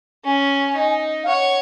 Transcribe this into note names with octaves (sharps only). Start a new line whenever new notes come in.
C#4 G#5
D#4
F5
C#5 F#5